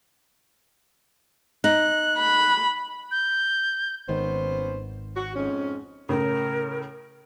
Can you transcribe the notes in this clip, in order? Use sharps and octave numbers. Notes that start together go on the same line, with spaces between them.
D#4 F#6
B5
G6
G#1 D#3 B3 C#4 C5
F#4
F2 G#2 C#4
A2 C#3 A#4